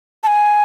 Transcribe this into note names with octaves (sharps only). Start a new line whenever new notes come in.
A5
G#5